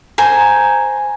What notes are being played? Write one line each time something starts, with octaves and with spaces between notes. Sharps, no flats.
C5 G#5 A#5